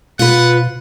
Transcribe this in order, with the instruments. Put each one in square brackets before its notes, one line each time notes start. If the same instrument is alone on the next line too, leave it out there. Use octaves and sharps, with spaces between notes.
[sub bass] B2 [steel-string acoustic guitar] F4 B4 [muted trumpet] F#5